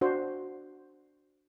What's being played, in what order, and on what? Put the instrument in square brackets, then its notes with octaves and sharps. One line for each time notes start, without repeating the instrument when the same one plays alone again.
[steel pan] D4 F#4 C5